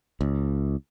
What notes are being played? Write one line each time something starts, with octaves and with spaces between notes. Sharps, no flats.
C#2